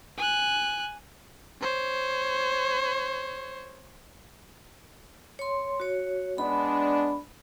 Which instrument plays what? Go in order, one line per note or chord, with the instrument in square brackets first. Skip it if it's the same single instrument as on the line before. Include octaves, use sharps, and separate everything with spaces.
[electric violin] G#5 F#6
C5 C#5
[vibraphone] C#5 C6
F#4 C#5
[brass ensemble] G#3 B3 D4 [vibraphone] B5